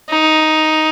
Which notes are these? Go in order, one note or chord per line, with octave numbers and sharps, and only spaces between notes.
D#4